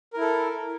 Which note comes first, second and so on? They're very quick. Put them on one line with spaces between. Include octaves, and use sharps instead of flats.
A#4 E4 A4